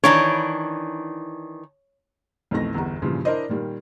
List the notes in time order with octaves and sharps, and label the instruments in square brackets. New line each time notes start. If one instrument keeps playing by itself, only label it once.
[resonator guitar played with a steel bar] D#3 E3 D4 [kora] C#5
[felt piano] B1 F2 E3 A3 A#6
G1 E2 A#5
G2 A#2 C#3 E3 F3
D4 E4 A#4 C5 D5 D#5
A#2 D#3 G3 A#3